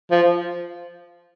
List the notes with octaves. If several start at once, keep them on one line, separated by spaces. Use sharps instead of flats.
F3